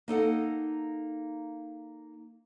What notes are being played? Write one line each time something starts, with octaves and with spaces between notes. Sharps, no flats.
A#3 D#4 A4 F#5